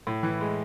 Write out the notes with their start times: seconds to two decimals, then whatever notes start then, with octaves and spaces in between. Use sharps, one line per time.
0.07 A2
0.23 E3
0.41 G#3